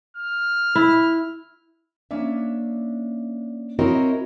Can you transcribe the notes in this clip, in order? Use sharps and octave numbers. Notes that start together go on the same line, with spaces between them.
F6
E4
A#3 C#4 D4 E5
C4 E4 F#4 A#4 C#5 D#5